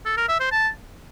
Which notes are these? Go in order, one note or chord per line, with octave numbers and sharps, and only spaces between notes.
A4
A#4
E5
C5
A5